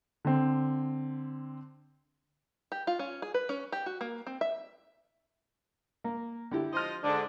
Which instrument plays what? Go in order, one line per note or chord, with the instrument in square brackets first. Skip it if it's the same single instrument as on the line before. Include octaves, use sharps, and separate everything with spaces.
[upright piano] D3 C4
[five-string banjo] G4
F4
C#4
G#4
B4
C#4
G4
F#4
A#3
C4
E5
[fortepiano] A#3
D3 E4 G4
[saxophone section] F3 C5 D#5 [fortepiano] C6 F6
[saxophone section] G#2 D3 [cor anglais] D4